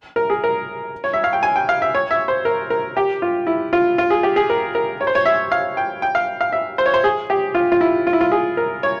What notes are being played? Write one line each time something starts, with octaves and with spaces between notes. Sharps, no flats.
A#4
G#4
A#4
C#5
E5
F5
G5
G#5
G5
F5
E5
C#5
E5
C5
A#4
A#4
G4
F4
E4
F4
F4
G#4
G4
G#4
A#4
A#4
C#5
C5
C#5
E5
F5
G5
G5
F5
F5
E5
C5
C#5
C5
G#4
G4
F4
F4
E4
F4
E4
F4
G#4
A#4
C#5